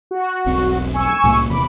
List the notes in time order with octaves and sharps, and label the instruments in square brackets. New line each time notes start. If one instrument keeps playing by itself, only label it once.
[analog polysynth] F#4
[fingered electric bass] E1 B1 C4
[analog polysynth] G#5 C#6 E6
[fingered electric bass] C2 A2 A#3
[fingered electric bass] D1 E2 C3 [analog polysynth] B5 D6